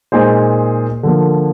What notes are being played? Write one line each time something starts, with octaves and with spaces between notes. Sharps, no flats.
A#2 G#3 D#4 G#4 C5
D3 F3 A#3